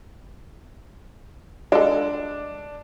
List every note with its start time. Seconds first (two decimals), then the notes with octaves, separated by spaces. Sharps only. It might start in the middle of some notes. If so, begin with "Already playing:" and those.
1.72 G#3 D4 A4